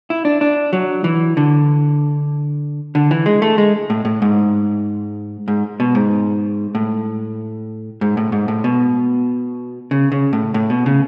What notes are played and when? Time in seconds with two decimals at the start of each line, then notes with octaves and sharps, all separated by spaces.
0.10 E4
0.25 D4
0.41 D4
0.73 F#3
1.04 E3
1.37 D3
2.95 D3
3.11 E3
3.26 G#3
3.42 A3
3.58 G#3
3.90 A2
4.05 A2
4.22 G#2
5.48 G#2
5.80 B2
5.95 G#2
6.75 A2
8.01 G#2
8.17 A2
8.32 G#2
8.48 A2
8.64 B2
9.91 C#3
10.12 C#3
10.33 A2
10.54 A2
10.70 B2
10.86 C#3